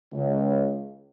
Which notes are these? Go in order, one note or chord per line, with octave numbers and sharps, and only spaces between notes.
C#2